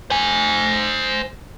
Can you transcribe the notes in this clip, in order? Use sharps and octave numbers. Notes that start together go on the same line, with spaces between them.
C5 G#5